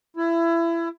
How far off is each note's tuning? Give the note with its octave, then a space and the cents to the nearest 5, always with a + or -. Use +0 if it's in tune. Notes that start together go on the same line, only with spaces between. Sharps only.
E4 +25